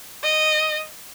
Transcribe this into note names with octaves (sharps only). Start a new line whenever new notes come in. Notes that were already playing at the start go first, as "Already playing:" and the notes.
D#5